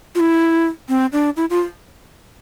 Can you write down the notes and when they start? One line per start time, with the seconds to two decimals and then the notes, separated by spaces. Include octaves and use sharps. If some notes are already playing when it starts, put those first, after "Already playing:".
0.15 F4
0.20 E4
0.89 C4
1.13 D4
1.37 E4
1.50 F4